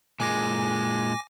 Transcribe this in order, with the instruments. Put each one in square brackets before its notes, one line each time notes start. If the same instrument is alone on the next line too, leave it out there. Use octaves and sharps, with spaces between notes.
[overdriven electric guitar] A#2 G#3 [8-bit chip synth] G#5 D6 A#6